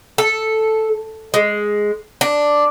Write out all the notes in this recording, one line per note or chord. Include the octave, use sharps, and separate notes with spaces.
A4
G#3
D4